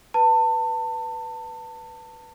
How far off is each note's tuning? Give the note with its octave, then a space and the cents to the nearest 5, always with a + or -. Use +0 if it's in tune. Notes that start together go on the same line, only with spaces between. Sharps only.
B4 +0 A5 +30